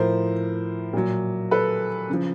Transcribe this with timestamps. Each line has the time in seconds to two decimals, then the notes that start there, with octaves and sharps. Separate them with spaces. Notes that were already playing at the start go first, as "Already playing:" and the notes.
Already playing: A2 F3 A#4 C5
0.93 A#2 F#3
1.51 A4 B4
2.10 C#3 F3